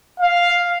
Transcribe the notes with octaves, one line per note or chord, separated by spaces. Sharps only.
F5